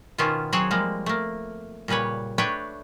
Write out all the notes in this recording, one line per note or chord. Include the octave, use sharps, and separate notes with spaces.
B2 D#3 B3 C#4 F4 C5
F#3 C4 G#4 C5 C#5 F#5
F3 G3 G#3 A#3
A3 A#3
A#2 C#3 G3 B4 C#5
A3 D4 B4 C#5 G5